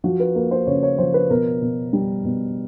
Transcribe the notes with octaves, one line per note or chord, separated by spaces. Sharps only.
F3 F#4
B4
A#3 A#4
C5
C#3 C#5
C#5
F3 C5
B4
B2 A#4
B2
G3
B2